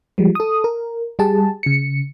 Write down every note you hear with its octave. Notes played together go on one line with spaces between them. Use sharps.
F3 G3 G#3
A4 D#6
A#4
G3 G4 G#4 A5
C#3 C#7